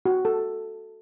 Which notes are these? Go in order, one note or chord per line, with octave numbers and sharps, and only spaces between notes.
F#4
A4